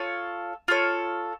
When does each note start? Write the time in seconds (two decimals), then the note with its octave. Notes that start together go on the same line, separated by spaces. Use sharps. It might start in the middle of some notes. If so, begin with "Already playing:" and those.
Already playing: F4 A4 C#5
0.68 F4 A4 C#5